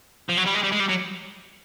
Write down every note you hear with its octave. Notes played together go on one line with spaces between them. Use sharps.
F3
F#3
G3
G#3
G3
G#3
G3
F#3